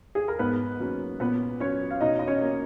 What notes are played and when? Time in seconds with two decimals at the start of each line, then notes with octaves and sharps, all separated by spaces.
0.15 G#4
0.28 A#4
0.39 G#2 B3 B4
0.80 F#3 A#3 C#4
1.20 A#2 B3 B4
1.60 F#3 C#4 C#5
1.91 F5
2.01 B2 D#4 D#5
2.19 D#5
2.27 C#4 C#5
2.41 A#3 C#4